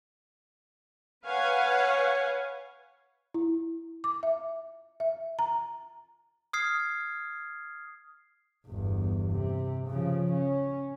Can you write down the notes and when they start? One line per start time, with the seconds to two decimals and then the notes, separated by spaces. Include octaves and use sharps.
1.25 B4 C#5 F5 F#5 G#5
3.34 E4
4.04 D6
4.23 E5
5.00 E5
5.39 A#5
6.53 D#6 F6 G#6 C7
8.68 G1 E2
9.32 C3
9.88 C#3 F3
10.32 C#4